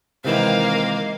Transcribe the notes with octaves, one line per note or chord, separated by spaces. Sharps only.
C3 D#3 E3 G#3 A#3 C4 F5